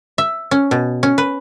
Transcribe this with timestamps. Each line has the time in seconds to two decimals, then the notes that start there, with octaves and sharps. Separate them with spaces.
0.18 E5
0.51 C#4
0.71 B2
1.03 C#4
1.18 B4